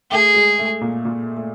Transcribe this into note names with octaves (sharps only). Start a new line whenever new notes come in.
A3 G#4
G#3
A3
A#2 A#3
A#2 A#3
A3